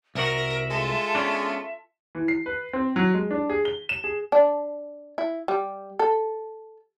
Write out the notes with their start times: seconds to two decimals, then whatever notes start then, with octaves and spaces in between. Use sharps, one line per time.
0.15 C2 F#4 A#4 E5
0.70 G#3 F4 A4
1.15 B3 C#4 D4
2.15 E3
2.28 C7
2.46 B4
2.73 C4
2.96 F#3
3.14 G#3
3.31 D4
3.50 G#4
3.65 G7
3.89 E7
4.04 G#4
4.32 D4
5.18 E4
5.48 G3
5.99 A4